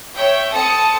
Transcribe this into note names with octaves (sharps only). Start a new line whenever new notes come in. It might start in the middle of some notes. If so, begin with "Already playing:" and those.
C#5 E5 G5
C4 A4 A5 D#6 C#7